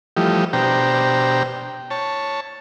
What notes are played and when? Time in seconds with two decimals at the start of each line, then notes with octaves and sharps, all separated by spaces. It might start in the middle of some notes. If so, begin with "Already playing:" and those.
0.17 E3 F3 G3 A3 G4 D#5
0.53 B2 D4 G4 C5 G5 A#5
1.91 C#5 A5